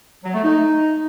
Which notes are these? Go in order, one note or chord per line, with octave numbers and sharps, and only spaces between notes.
F#3
A3
D#4